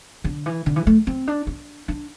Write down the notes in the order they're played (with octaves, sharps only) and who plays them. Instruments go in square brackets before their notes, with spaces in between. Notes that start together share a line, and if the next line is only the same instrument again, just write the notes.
[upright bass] D3
E3
D3
E3
A3
C4
D4
D4
D4